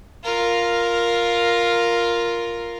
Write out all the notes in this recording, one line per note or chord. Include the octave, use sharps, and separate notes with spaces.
F4 A#4